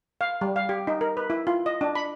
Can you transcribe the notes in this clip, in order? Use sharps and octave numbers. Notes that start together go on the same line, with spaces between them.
F5
G3
F5
G4
D#4
A#4
B4
E4
F4
D#5
D4
B5